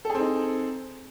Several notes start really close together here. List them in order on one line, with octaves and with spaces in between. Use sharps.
A4 G#4 C4 D#4